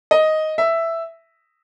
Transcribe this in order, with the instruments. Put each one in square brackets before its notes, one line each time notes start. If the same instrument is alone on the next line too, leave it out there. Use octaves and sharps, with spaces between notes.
[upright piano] D#5
E5